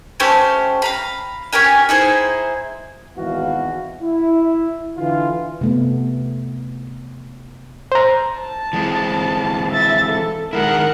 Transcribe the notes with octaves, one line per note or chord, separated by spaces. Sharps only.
A3 C#4 G4 C5
F5 A#5 B5
C#4 G4 A#4 G#5
D#4 E4 G#4 C5
G#1 E2 B2 E3 F#4 F5
E4
D3 E3 F4
C3 A3 B3
C5 A#5
A5
E3 G#3 C4
E5 A6
A4
D#3 G#3 E4 A#4 F#5